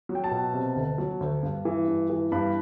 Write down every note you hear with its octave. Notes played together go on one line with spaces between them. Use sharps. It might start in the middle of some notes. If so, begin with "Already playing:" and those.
F#3
G5
A5
B2
C3
D2
F#3
D2
G2
E3
G2
E3
G2 B5